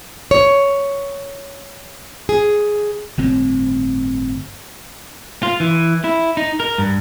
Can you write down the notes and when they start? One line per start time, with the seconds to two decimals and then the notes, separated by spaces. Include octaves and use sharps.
0.31 C#5
2.29 G#4
3.18 G1 A2 C4
5.43 F4
5.60 E3
6.04 E4
6.37 D#4
6.60 A#4
6.78 G2